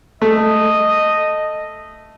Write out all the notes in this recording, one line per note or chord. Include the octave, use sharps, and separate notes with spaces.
A3 D#5